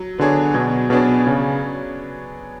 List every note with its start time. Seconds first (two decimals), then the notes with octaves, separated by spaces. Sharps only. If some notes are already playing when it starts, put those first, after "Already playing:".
Already playing: F#3
0.18 D3 B3 D4 G#4 C#5
0.54 B2 F#3
0.90 B2 B3 D4 G#4 C#5
1.27 C#3